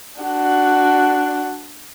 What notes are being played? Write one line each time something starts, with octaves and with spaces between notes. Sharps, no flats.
D4 F#4